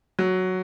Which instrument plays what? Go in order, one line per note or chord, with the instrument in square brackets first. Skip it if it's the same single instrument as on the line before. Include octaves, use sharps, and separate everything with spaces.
[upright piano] F#3